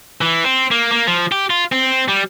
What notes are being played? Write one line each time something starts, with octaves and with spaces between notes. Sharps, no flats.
E3
C4
A#3
A#3
F3
G4
F4
C4
G3